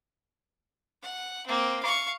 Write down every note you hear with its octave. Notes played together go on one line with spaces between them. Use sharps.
F#5
A#3 C4
F5 C#6